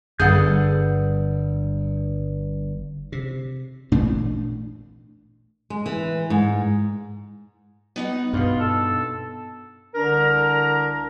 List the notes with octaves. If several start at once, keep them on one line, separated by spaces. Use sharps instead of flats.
G1 G2 G#4 A4 F#5 G6
C3
A1 A#2 A3 D4
G#3
E3
G#2
B3 D#4 F#5
G2 B2 F4
A4
C2 D3 D4 A#4 A#5